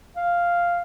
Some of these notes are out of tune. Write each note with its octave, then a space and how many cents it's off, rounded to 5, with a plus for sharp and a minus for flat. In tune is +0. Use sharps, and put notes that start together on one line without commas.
F5 -5